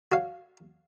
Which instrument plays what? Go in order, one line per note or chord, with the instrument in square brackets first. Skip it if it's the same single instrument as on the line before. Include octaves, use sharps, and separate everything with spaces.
[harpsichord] F#4 C#5 F5